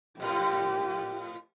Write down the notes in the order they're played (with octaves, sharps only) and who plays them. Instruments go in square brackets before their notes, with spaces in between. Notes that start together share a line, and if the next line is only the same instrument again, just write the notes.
[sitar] F2 A2 A#4 [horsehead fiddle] G4